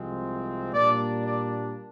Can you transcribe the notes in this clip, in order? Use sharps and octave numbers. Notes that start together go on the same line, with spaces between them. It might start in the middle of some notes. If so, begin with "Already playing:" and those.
Already playing: C2 C3 F3 G#3 C4
A#2 G3 A#3 D4 D5
D5